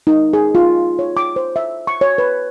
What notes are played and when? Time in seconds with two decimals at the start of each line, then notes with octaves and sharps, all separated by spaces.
0.07 D#4
0.33 G#4
0.55 F4
0.99 C#5
1.17 D6
1.36 C5
1.56 E5
1.87 C#6
2.01 C#5
2.18 B4